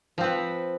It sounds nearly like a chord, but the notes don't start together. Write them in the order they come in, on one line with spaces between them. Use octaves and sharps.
F3 C4 B4